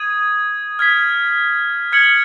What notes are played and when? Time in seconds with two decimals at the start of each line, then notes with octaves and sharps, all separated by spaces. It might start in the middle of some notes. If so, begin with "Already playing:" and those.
Already playing: D#6 G#6 D#7
0.79 F6 G#6 B6
1.92 F6 G#6 C#7 F#7